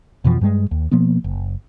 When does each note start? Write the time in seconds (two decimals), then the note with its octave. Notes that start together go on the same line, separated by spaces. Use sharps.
0.24 F2 B2 E3 F3
0.41 G2 G3 G#3
0.71 D#2
0.91 B2 F3 A#3 B3
1.24 F#1